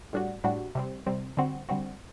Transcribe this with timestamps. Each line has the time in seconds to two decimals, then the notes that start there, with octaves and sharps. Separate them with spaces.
0.13 A2 G3 D4 F#4
0.44 A2 G3 D4 F#4
0.75 C3 G3 C4
1.07 C3 G3 C4
1.37 D3 G3 C4 F#4
1.69 D3 G3 C4 F#4